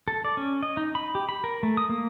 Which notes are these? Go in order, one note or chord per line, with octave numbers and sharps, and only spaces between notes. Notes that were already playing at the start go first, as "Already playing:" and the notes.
A4
D5
C#4
D#5
D#4
B5
G4
B5
A#4
A3
D#6
A#3